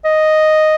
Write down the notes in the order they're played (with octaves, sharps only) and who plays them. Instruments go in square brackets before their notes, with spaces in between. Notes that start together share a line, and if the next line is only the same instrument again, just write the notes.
[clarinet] D#5